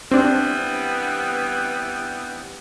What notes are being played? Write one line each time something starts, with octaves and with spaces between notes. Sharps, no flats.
E3 G3 B3 C4 D4